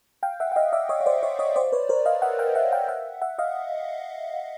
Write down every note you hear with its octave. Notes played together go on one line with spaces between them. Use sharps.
F5 G5
E5 F#5
F#5
D#5 F5
D5 E5
C#5 D#5
C#5
C5 D5
C#5 D#5
C#5 D#5
C5 D5
B4 C#5
A#4 C5
D#5 F5
E5 F#5
F5 G5
E5 F#5
F5 G5
E5 F#5
E5 F#5
D#5 F5